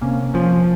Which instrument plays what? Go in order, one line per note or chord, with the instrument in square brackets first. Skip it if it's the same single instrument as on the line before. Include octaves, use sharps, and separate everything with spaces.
[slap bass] C3 [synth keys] A#3 C#4
[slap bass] F3 [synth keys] C#4 F4